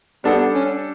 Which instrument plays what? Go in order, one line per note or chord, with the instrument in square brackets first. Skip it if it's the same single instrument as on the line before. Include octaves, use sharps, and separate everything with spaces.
[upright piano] G3 D4 A4 [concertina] B3
[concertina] C#4